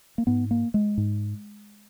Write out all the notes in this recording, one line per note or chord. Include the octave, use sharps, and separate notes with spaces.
A#3
G#2 B3
A#3
G#3
G#2